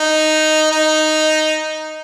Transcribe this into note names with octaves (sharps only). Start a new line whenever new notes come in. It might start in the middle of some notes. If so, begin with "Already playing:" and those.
Already playing: D#4
D#4